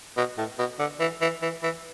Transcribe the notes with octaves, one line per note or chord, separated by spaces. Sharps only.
B2
A2
B2
D3
E3
E3
E3
E3